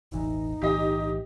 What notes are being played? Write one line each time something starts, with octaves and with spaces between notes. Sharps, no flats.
E1 A1 E3 D#4
B1 A2 E3 G4 D#5